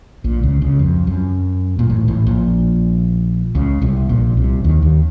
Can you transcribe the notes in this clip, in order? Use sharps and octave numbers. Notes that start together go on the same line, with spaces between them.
A#1 A#2
C#2 C#3
C#2 C#3
F2
F#2
A#2
A1 A2
A1 A2
A#1 A#2
C#2 C#3
C2 C3
A#1 A#2
C2 C3
D#2 D#3
D#2 D#3